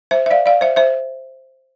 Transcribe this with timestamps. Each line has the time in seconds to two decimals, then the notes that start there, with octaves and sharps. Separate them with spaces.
0.11 C5 E5
0.26 E5
0.31 D5 F5
0.46 D5 F5
0.61 C5 E5
0.76 C5 E5